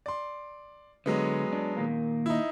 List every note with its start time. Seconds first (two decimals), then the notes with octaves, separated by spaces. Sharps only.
0.06 D5 C6
1.06 D3 F#3 G#3 B3
1.53 D4
1.76 A#2 D#3 A#3
2.26 D#4 E4